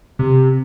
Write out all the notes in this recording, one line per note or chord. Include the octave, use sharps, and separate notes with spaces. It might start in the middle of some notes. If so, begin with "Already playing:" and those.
C3